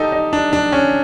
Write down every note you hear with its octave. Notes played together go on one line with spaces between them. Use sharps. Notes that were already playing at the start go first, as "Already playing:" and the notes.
Already playing: D#4 G4 A4
D#4
D4
D4
C#4